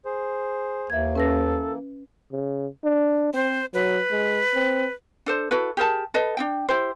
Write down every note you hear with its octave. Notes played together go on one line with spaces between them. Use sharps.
G#4 C5
D#2 E3 A#3 E5 G#6
C#4 A4 B4 A#6
C#3
D4
C4 C5
F#3 B4
G#3
C4
D4 A4 C5
E4 F#4 A4 B4
G4 G#4 A#4 A5
A4 B4 D#5
D4 D#4 G5
E4 G4 C5